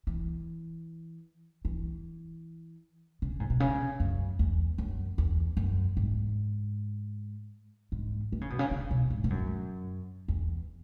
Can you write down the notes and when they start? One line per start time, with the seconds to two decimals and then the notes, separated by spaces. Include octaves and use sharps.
0.07 E3
1.65 E3
3.22 C#3
3.40 G#2
3.50 B2
3.60 C#3
4.00 F#2
4.39 E2
4.78 F#2
5.18 E2
5.57 F#2
5.97 G#2
7.92 G#2
8.32 E3
8.41 C#3
8.50 B2
8.59 C#3
8.71 C#3
8.91 B2
9.10 G#2
9.24 G#2
9.30 F#2
10.28 E2